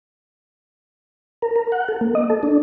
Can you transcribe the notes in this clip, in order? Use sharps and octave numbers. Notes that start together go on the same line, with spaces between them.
A#4
A#4
F#5
A4
A#3
D#5
A4
D4